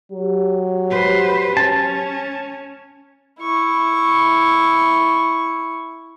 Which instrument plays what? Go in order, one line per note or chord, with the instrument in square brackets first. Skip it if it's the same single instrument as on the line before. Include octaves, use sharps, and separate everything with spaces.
[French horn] F#3 [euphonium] G4
[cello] B4 C5
[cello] C#4 [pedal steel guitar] A5
[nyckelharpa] E4 C#6